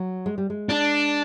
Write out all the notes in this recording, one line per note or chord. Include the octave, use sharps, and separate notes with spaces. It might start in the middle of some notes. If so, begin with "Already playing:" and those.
Already playing: F#3
G#3
G3
G#3
D4